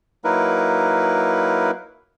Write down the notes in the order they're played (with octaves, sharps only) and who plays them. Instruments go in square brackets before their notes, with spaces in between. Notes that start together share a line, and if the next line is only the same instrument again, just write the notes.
[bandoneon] F#3 A#3 D#4 E4 A#4 B4